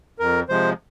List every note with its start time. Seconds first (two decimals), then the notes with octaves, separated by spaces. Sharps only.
0.19 F2 A#4
0.49 C3 F3 G#3 C5